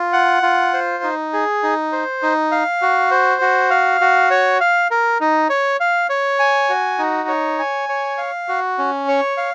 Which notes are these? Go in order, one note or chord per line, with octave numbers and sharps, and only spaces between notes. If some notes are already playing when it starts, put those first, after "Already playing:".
Already playing: F4
F#5
F4
C5
D#4
G#4
D#4
C5
D#4
F5
F#4
C5
F#4
F5
F#4
C#5
F5
A#4
D#4
C#5
F5
C#5
G#5
F#4
D#4
C#5
G#5
C#5
F5
F#4
C#4
C#5
F5